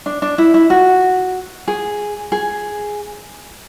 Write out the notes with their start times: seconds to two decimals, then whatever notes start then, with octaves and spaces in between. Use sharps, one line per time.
0.06 D4
0.22 D4
0.38 E4
0.54 E4
0.70 F#4
1.68 G#4
2.32 G#4